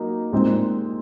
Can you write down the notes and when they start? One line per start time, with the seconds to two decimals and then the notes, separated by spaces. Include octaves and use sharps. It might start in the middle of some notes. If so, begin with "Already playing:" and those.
Already playing: F#3 A#3 D#4
0.33 A#2 G#3 C4 D#4